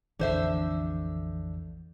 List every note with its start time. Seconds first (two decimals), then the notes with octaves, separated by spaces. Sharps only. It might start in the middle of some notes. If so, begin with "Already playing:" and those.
0.19 A#1 F2 D3 E3 C5 E5